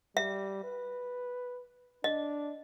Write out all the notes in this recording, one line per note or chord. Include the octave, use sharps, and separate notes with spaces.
G3 E5
B4
D4 D#5